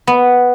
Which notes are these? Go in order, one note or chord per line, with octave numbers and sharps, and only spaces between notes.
B3